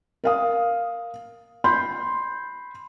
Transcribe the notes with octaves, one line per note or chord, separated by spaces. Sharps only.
A#4 F5 D#6
B5 C6 G6